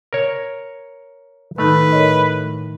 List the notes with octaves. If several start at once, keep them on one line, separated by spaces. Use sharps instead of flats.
A#4 C#5
A2 D#3 A3 D#4 B4
A#4 C#5 D#5